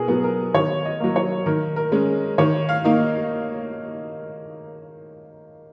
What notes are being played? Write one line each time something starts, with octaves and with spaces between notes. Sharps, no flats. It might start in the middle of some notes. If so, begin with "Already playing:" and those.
Already playing: B2 G#4 A#4 B4
F#3 B3
A#4
D#3 C#5
D#5
F#3 A#3
C#5
D#3 A#4
A#4
G#3 C#4
D#3 C#5
F5
A#3 D#4